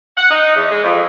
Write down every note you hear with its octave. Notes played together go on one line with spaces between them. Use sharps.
F#5
D#4
E2
G#3
F2